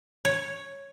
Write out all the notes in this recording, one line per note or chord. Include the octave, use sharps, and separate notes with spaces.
C#5